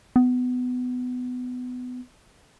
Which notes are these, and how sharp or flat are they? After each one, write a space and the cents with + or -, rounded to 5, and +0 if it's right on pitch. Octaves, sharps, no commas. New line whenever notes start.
B3 +20